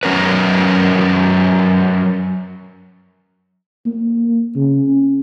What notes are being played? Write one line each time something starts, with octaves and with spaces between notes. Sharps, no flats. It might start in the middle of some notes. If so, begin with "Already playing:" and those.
F#3 C#4 A#4 B4
A#3
C#3
C#4